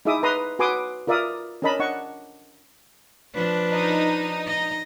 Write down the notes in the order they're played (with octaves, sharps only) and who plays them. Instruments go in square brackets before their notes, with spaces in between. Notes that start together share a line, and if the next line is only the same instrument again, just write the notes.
[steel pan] D#4 E4 G#4 E5 D6 D#6
B4 A#5 C6 D#6
F#4 B4 G#5 C6 D6 D#6
F4 A#4 D5 E5 F5 D#6
C#4 D4 A#4 D#5 A5 B5
D4 D#5 F#5 C#6
[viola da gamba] F3 D4 B4
[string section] D#4
[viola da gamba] D#5